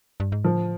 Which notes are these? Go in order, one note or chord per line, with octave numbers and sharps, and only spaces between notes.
G2
G#2
A2 F3